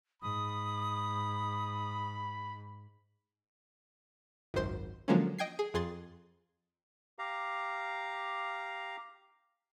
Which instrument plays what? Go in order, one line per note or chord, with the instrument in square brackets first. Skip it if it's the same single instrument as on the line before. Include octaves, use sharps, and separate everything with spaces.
[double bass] G#2 [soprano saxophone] B5 [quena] D#6
[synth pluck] G#1 C#2 F#2 C5 C6
D3 F3 F#3 G#3 A#3 C#4
D#5 G5 G#6 C7
G#4
F2 G#4 C6 A6
[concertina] G4 F5 A#5